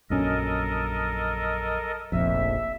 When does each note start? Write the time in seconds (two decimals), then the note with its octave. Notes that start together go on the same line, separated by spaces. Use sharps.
0.10 A#1 F#2 C#4 A4 A#4 D#5
2.12 F1 A#1 F2 E5